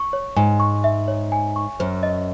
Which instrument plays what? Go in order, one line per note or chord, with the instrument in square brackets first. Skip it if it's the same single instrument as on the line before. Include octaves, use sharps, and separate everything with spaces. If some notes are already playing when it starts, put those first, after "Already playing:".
Already playing: [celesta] C#6
C#5
[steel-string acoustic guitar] G#2 [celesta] G#5
[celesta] C#6
E5
C#5
G#5
C#6
[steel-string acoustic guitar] F#2 [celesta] C5
[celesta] D#5